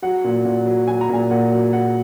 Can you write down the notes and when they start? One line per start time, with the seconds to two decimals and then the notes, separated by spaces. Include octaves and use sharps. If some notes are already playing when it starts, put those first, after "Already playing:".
0.02 F#3 F#5
0.24 A#2
0.45 A#2
0.66 F#3
0.87 F#3 G#5
1.01 A#5
1.09 A#2 G#5
1.31 A#2 F#5
1.52 F#3
1.73 F#3 F#5